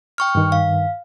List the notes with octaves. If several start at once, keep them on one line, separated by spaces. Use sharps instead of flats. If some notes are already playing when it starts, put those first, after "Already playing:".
G5 C#6 F6
G2 D#3
F5